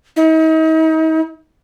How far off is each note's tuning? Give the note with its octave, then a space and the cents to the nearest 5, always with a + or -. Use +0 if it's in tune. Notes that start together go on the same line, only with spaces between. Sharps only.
D#4 +40